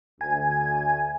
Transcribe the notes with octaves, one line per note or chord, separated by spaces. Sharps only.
D2 G#5